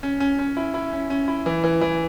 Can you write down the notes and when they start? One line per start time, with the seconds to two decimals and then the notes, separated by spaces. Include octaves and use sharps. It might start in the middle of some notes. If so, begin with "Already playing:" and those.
0.03 C#4
0.20 C#4
0.39 C#4
0.57 E4
0.74 E4
0.93 C#4
1.10 C#4
1.28 E4
1.46 E3
1.64 E3
1.81 E3